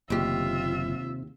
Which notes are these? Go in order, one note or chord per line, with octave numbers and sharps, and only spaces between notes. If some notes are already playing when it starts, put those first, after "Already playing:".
F#1 D#2 C3 F4 G4 E5